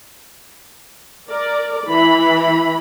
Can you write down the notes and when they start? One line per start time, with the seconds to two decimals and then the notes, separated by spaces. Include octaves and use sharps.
1.29 A#4 D5
1.88 E3 B5